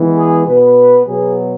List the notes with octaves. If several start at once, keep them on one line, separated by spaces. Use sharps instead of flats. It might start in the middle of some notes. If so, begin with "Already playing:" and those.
Already playing: E3 G#3 B3
G#4
B2 B3 B4
B2 F#3 B3 G#4